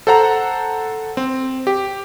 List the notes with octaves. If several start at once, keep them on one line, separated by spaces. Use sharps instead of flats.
A4 C5 F#5 A#5
C4
G4